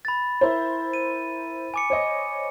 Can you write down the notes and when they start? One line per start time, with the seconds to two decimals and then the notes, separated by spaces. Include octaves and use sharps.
0.05 B5 A6
0.41 E4 A#4 C5
0.93 D#7
1.74 G#5 D6 C#7
1.90 C5 C#5 D#5